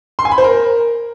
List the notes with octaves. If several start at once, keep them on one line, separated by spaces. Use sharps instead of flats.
C6
G#5
B5
C5
A#4